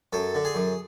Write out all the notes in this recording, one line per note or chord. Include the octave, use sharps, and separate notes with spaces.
F#2 A4
D3
G#4
F#2